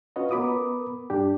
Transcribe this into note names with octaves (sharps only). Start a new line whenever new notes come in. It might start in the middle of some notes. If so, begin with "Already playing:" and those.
C#4 F4 F#4 B4 C#5 D#5
B3 A#4 B5 D6 D#6
G2 D4 G4